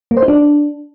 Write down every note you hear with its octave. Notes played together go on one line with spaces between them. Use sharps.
A#3
C5
D#4
D4